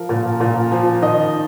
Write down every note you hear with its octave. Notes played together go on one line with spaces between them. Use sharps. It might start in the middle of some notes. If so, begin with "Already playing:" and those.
Already playing: F3 A#4
A#2
A#2
F3
D#3 D#5